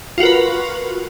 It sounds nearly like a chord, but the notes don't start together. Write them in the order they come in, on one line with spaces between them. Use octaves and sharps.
F4 F#4 A#4 B4